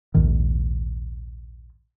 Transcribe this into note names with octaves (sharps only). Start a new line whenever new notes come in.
A#1 D#2 G#2 D#3